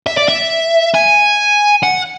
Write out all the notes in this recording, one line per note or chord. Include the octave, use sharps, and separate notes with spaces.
E5
D5
E5
G#5
F#5